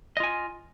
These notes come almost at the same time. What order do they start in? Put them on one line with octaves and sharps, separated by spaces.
D#5 F4 G#5